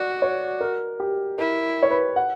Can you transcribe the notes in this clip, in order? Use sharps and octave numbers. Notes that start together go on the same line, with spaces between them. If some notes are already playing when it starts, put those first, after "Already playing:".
Already playing: F#4 D5
C#5
A#4
G4
E4 A#4
C#5
B4
F#5